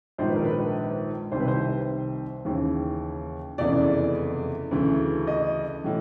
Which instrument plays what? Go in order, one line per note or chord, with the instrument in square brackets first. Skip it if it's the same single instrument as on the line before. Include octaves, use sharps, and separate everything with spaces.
[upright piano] A#1 G#2 D#3 C5
B4
A#4
B4
C2 C3 D#3 C5
B4
C5
D#2 C#3 E3
F1 E2 C#3 E3 D5
D2 C#3 E3
D#5
A2 E3